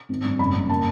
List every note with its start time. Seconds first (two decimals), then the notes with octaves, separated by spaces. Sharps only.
0.09 G#1
0.24 G2
0.39 F#1 B5
0.55 F#1
0.69 A#3 A5